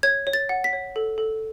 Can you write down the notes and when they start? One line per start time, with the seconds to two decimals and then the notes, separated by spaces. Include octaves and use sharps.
0.03 C#5 G#6
0.27 C#5
0.33 A6
0.49 F#5
0.64 B6
0.73 C#5
0.96 A4
1.18 A4